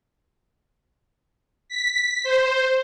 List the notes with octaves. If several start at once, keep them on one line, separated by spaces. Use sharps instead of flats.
B6
C5